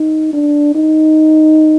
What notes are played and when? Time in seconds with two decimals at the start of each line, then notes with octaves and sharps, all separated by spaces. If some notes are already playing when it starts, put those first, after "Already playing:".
Already playing: D#4
0.33 D4
0.75 D#4